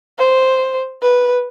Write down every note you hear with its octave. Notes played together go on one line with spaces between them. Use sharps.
C5
B4